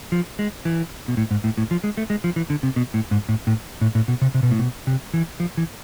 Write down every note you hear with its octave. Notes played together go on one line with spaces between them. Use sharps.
F3
G#3
E3
B2
A2
G#2
A2
A2
F3
G#3
A3
G#3
F3
E3
D3
C3
B2
A2
G#2
A2
A2
A2
A2
B2
C3
C3
B2
A2
B2
C3
E3
F3
E3